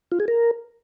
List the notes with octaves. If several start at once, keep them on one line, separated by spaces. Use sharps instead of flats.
F4
G#4
A#4